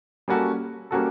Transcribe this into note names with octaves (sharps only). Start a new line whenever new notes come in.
G3 A#3 C#4 F#4 A4
G3 A#3 C#4 F#4 A4